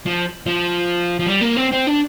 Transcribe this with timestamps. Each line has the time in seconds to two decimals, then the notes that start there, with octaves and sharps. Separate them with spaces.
0.06 F3
0.46 F3
1.19 F3
1.26 G3
1.41 A#3
1.57 C4
1.72 C4
1.87 D4